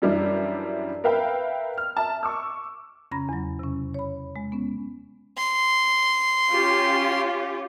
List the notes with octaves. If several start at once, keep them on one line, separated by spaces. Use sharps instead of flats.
F#2 E3 G3 D4 E4
A#4 B4 E5 F5 G5 B5
F6
E5 A5
C#6 D6 E6
F2 C#3 C#4 A#5 B5 A#6
E2 F#3
C3 C#4
C#5 B5
G#3
B3 C#4
C6
C#4 F4 G4